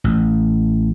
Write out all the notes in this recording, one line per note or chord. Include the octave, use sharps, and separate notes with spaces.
A1